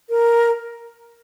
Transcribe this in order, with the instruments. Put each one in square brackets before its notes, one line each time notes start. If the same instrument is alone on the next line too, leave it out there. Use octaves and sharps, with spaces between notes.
[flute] A#4